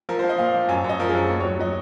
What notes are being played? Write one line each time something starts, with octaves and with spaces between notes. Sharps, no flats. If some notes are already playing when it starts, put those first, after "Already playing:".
F3 A#4
C5
F3
D#5
A#2 F5
F3
F#2 G#5
F#2
D#5
F3 A#4
G#4
F#2
D#2
C#5
F#3
F#3 D#5